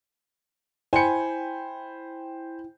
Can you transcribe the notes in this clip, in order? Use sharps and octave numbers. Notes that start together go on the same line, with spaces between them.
E4 C5 G5 G#5 B5 C#7